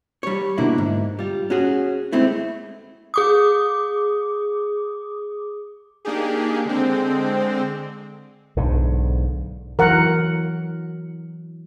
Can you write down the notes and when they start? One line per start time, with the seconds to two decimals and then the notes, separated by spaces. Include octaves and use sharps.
0.23 G3 C#5
0.58 B2 D3 A#3 D4 E4
0.78 G#2
1.19 G3 F4
1.50 C#4 F#4 G#4
2.13 G#3 A3 C4 E4
3.14 G#4 D6 D#6
6.05 A#3 D4 D#4 G4 G#4
6.66 D3 G#3 C4
8.56 B1 G#2 D3
9.79 E3 F#3 A#4 F#5